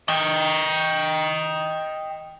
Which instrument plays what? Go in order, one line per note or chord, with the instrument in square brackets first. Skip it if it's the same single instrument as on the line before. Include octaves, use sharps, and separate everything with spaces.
[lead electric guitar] D#5 G5